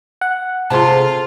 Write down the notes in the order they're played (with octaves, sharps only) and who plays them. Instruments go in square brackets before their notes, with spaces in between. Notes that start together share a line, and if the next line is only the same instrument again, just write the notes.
[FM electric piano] F#5
[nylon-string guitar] C3 G#4 A4 [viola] F4 [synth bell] A5 C6